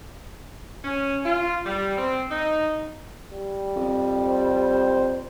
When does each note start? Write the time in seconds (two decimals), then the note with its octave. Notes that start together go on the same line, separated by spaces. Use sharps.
0.84 C#4
1.25 F4
1.65 G3
1.98 C4
2.31 D#4
3.31 G3
3.76 F2
4.24 C5